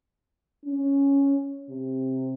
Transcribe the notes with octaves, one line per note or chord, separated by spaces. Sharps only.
C#4
C3